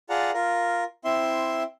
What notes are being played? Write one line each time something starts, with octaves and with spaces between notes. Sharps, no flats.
F4 G#4 D5 F#5 A5 A#5
F4 A#4
C4 E4 E5 C6